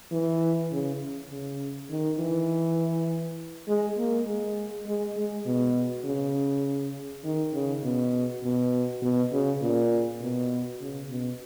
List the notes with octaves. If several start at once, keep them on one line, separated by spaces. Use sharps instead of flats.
E3
C#3
C#3
D#3
E3
G#3
A#3
G#3
G#3
G#3
B2
C#3
D#3
C#3
B2
B2
B2
C#3
A#2
B2
C#3
B2